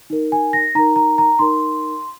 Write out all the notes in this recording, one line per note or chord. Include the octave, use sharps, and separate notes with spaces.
D#4 A#4
G#5
A#6
D#4 A#4 A#5
A#5
A#5
D#4 A#4 C6